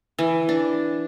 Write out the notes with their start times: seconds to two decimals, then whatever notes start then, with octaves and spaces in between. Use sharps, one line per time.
0.19 E3
0.49 D4